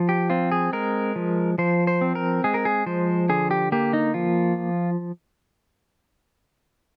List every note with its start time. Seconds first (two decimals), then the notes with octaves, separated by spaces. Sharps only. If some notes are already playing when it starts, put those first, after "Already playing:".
Already playing: F3
0.09 G4
0.30 C4 F4
0.52 G#4
0.73 G#3 A#4
1.16 F3
1.58 F3 C5
1.87 C5
2.01 C4
2.15 A#4
2.44 G#3 G#4
2.54 A#4
2.65 G#4
2.86 F3 C5
3.29 D3 G#4
3.51 G4
3.72 A#3 G4
3.93 D#4
4.14 F3 F4